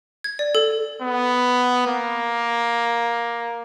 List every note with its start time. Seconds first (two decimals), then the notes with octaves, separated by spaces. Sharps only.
0.24 G#6
0.39 D5
0.55 A4
1.02 B3
1.87 A#3